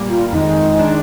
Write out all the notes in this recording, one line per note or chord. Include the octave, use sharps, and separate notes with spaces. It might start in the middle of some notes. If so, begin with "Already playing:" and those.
Already playing: A#2 G3 A#3
F4
F2 D#3 G#3 D#4
D#3 G#3 D4